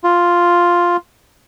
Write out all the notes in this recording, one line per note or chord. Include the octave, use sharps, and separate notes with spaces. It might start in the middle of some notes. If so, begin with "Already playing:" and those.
F4